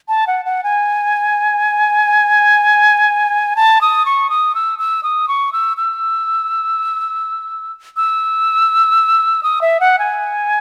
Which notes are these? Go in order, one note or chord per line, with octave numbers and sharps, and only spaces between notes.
A5
F#5
F#5
G#5
A5
D#6
C#6
D#6
E6
E6
D#6
C#6
E6
E6
E6
D#6
E5
F#5
G#5